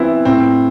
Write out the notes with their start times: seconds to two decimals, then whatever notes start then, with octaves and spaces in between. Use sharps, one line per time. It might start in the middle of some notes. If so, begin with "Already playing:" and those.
Already playing: E3 B3 C4 E4
0.25 A2 C4